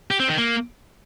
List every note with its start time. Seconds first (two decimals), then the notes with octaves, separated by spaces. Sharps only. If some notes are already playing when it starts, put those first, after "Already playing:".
0.11 G4
0.20 C4
0.29 D#3
0.38 A#3